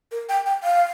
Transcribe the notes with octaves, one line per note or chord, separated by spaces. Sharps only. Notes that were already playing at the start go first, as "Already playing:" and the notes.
A#4
G5
G5
F5